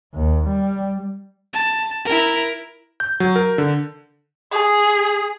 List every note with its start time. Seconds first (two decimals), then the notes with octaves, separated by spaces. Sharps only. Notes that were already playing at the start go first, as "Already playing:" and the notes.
0.14 D#2
0.47 G3
1.53 A5
2.05 E4 A#4
3.00 G6
3.20 F#3
3.36 A#4
3.58 D3
4.52 G#4